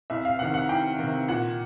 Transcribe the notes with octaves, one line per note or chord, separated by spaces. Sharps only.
C2 E5
F5
C3 D#3 F#5
F#5
C2 G5
C3 D#3
A#2 F#5